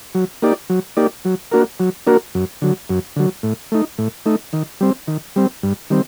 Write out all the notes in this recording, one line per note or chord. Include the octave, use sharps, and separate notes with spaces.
F#3
A#3 D#4 G4 D5
F#3
A#3 D#4 G4 D5
F#3
A#3 D4 F#4 A#4
F#3
A#3 D4 F#4 A#4
F#2
D3 F#3
F#2
D3 F#3
A2
A3 D#4
A2
A3 D#4
D#3
G3 C4
D#3
G3 C4
G2
D#3 G3 C4